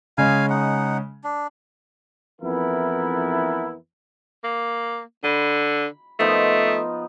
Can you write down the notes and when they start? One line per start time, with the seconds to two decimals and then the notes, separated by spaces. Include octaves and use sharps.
0.18 C#3 G#3 C#4 F5 G#5
0.50 D#4 F#5
1.24 D4
2.42 F2 E3 B3 E4 A#4
4.44 A#3
5.24 D3 B5
6.20 F3 A3 B3 D#4